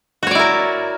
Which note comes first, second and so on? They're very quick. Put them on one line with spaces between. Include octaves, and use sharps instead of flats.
F#4 C#5 D5 E4 A#4